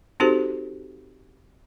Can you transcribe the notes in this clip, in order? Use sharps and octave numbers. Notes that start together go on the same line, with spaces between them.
C4 D#4 F#4 G4 A4 C5